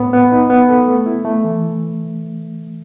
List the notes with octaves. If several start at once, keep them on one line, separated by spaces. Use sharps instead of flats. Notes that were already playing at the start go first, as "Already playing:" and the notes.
Already playing: A2 B3
B3
D#4
B3
A4
A3
E4
A3
E3